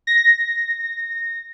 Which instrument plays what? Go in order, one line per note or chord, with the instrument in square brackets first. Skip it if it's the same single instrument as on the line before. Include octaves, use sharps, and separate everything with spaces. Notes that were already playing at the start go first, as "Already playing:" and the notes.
[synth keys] A#6